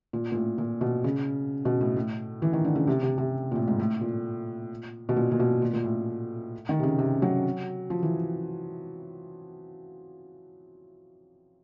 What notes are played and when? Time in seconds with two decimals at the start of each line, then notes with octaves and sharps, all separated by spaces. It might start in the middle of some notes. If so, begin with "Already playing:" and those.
0.13 A#2
0.32 A#2
0.35 A2
0.58 A#2
0.81 B2
1.04 C#3
1.65 B2
1.81 A2
1.96 A2
2.42 E3
2.53 D#3
2.65 D3
2.75 C#3
2.87 C3
3.03 C3
3.18 C3
3.52 A#2
3.55 A2
3.68 G#2
3.79 A2
4.01 A#2
5.09 B2
5.17 A#2
5.32 A#2
5.40 B2
5.62 A#2
5.73 A#2
5.84 A2
6.69 D#3
6.79 C3
6.83 C#3
6.99 C3
7.22 F#3
7.90 F3
8.03 E3